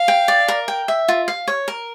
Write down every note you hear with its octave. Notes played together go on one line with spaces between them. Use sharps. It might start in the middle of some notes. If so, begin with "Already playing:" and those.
Already playing: F5
G5
D5
A#4
G5
E5
F4
F5
C#5
A#4